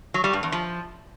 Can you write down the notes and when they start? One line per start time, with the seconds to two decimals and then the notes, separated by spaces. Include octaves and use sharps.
0.14 F#3
0.24 G3
0.33 G2
0.43 E2
0.52 F3